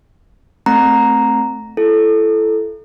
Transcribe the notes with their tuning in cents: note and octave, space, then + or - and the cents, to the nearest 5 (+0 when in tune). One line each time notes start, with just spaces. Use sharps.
A3 +0 C4 +0 A#5 +0
E4 +30 A4 -10